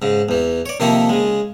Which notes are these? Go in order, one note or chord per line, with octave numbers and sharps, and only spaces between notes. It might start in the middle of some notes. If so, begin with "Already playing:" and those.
G#2 C#3
E2 E3
C#5 D5
C3 D#3 F3 A#3 E4 A4
C#3 G#3